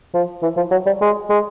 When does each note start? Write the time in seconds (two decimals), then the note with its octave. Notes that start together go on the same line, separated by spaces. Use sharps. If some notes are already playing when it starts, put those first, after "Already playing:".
0.14 F3
0.43 E3
0.57 F3
0.71 F#3
0.86 G3
1.01 G#3
1.30 G#3